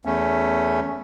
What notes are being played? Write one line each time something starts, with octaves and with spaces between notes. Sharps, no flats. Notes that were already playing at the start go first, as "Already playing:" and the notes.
E2 A3 C#4